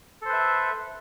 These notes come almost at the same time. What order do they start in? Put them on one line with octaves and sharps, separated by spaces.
A4 C5 B4 E5